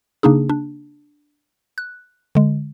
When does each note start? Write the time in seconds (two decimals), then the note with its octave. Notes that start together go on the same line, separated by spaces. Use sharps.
0.23 C#3 A#3 D4 D#4 G#4
0.49 D4
1.78 F#6
2.35 D3 G#3